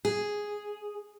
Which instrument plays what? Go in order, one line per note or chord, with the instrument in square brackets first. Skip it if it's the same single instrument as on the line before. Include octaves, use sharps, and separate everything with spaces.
[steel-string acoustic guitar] G#4